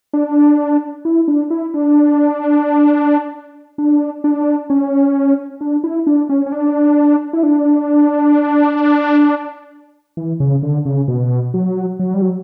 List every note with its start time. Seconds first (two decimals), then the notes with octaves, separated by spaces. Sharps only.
0.13 D4
1.05 E4
1.28 D4
1.50 E4
1.74 D4
3.78 D4
4.24 D4
4.70 C#4
5.61 D4
5.84 E4
6.07 D4
6.29 C#4
6.46 C#4
6.52 D4
7.33 E4
7.43 D4
10.17 E3
10.40 C#3
10.63 D3
10.85 C#3
11.08 B2
11.54 F#3
11.99 F#3
12.14 G3
12.22 F#3